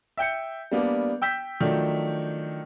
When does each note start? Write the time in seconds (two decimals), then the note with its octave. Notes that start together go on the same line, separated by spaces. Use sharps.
0.17 E5 G5 G6 C#7
0.71 G3 A#3 B3 D4
1.22 G5 E6 G6 B6
1.60 D#3 F3 F#3 A3 D4